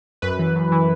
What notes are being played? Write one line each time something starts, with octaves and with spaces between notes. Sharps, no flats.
F#2 B4
E3
F#2
E3